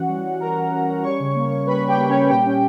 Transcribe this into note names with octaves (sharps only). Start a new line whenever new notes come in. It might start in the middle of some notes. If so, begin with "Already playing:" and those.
Already playing: E3 C#4 F#4 F#5
G3
C#4
E3 A#4 A#5
E3
C#4
C#4
G3 C#5 C#6
C#3
A#3
A#3
G3 B4 B5
G3
G4 G5
A#3
G3 C#4 C#5
A#2 G4 G5
C#4